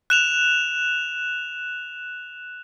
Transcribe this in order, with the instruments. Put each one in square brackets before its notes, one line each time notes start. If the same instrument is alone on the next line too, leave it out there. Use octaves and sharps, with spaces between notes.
[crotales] F#6 E7 F7